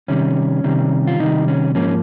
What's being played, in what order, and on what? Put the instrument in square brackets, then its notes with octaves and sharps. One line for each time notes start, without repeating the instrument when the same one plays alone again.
[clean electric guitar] C3 D#3 G3 C#4
C3 D#3 G3
F4
C3 D#3 G3 D#4
C#4
G#2 F3 A#3 C#4